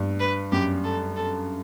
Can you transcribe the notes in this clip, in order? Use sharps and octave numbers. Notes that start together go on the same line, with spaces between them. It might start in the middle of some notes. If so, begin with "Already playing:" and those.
Already playing: G2
B4
F#2 G4
A4
A4